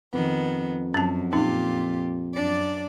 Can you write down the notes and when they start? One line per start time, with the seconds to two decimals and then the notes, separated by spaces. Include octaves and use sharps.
0.13 F2 D#3 B3
0.94 F#2 C#4 A5
1.33 A#2 C#4 D#4 F4 G4
2.35 F#2 D4 D5